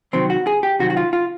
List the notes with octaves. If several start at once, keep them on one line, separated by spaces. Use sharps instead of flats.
C3 D#3 F#3 C4
F#4
G#4
G4
C3 D#3 F#3 F#4
F#4
F4
F4